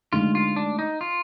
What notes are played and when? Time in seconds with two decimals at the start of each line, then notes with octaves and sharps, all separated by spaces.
0.13 D2 D3 G#3 D#4 F4
0.35 F4
0.56 D4
0.79 D#4
1.01 F4